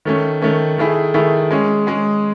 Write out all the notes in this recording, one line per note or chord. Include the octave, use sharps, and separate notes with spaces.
D#3 A3 C#4
D#3 A3 C#4
D#3 A3 E4 G#4
D#3 A3 E4 G#4
G#3 C#4 G#4
G#3 C#4 G#4